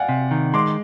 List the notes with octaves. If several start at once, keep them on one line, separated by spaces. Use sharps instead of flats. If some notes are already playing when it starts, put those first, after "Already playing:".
Already playing: D5 F5 F#5 G#5
C3
D#3
G#3 C6 D6